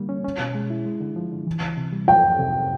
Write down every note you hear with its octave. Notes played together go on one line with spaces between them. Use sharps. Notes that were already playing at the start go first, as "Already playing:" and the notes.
Already playing: D3 G3 A#3
C#4
C#4
B2
G#3
E4
G#3
D3
F3
D3
E3
C#2
C3
G3
F3 G5
F2
C3